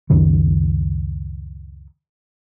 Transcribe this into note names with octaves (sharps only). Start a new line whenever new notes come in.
C#2 F#2 D#3 F#3